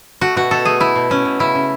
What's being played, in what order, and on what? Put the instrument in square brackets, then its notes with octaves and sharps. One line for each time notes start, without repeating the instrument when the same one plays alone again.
[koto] A3 F#4
B2 F#4
B2 A4
A3 G#4
A3 E4
B2
A3 C#4
B2
C#3 E4
C#3